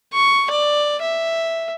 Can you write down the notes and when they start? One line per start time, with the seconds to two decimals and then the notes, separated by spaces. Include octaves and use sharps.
0.13 C#6
0.50 D5
1.02 E5